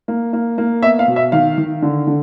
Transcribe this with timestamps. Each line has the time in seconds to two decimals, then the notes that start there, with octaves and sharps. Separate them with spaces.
0.08 A#3
0.33 A#3
0.58 A#3
0.83 B3 E5
0.99 F5
1.08 B2
1.16 E5
1.32 D#3 F5
1.58 D#3
1.82 D3
2.07 D3